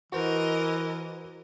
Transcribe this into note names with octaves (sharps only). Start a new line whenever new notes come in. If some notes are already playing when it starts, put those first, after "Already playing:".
E3 F#4 A#4 C5 D#5